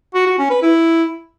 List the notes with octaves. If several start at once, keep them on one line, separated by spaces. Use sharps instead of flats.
F#4
F#4
C#4
B4
E4